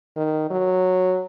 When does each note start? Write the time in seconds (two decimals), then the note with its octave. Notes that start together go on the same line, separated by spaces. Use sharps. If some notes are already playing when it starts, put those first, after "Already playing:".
0.17 D#3
0.51 F#3